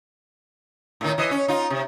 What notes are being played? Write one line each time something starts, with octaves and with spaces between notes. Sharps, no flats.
A2 D#3
E3 D#5
C#4
D#4 F4
C3